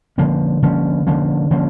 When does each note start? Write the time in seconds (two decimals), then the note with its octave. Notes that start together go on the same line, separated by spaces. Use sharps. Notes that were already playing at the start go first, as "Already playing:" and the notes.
0.18 D3 F3 A#3 C#4
0.62 D3 F3 A#3 C#4
1.07 D3 F3 A#3 C#4
1.51 D3 F3 A#3 C#4